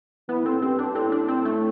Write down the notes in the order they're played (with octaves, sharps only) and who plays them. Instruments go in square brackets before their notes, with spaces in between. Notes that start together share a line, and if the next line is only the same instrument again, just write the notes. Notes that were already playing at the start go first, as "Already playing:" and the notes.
[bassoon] E3 [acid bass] B3
[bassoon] A2 [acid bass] C4
[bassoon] G2 [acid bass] C4
[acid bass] D4
[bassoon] A2 [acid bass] C4
[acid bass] D4
C4
A3